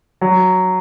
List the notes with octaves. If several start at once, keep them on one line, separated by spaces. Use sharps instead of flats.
F#3